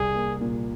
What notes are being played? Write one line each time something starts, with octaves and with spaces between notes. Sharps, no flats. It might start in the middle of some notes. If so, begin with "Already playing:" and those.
Already playing: C2 G#4
A#3
A#2